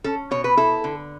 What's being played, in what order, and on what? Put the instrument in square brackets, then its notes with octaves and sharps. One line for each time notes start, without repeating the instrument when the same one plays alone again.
[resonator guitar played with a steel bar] C#4 A4
B2 C#5
B4
E4 A4
D3